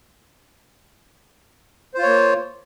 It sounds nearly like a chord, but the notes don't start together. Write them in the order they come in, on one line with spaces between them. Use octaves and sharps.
C5 F4 C#5 A#3